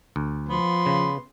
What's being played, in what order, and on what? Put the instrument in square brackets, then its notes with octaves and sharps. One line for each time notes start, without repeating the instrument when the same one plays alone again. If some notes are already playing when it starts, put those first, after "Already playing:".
[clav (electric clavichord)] D2
[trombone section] F3 [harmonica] B3 C6
[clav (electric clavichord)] C#3